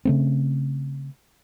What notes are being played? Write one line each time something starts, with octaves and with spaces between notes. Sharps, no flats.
C#3 A3 C4